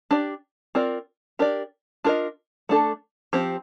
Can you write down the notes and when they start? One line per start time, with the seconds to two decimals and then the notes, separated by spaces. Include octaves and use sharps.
0.11 D4 G4 D5
0.75 C4 F4 A#4 D5
1.39 D4 G4 A#4 D5
2.04 D4 F4 A#4 D#5
2.69 A3 D4 A4
3.33 F3 C4 G4